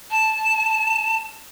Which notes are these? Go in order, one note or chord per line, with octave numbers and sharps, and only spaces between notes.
A5